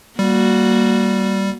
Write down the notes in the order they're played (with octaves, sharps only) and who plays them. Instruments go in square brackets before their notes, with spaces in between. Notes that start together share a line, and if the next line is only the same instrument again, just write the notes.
[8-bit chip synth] G3 [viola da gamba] A#3 F#4